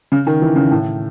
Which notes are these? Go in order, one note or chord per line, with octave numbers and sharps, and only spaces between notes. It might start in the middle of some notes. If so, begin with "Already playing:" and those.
C#3
D#3
E3
C#3
A2